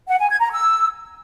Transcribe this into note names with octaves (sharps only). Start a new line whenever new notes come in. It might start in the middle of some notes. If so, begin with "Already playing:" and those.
F#5
G#5
G#6
A#5
E6